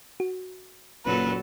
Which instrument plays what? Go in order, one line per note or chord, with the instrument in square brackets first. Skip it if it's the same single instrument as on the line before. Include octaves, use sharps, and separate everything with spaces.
[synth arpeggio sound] F#4
[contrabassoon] F#1 [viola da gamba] A#2 F#3 A4 [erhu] B4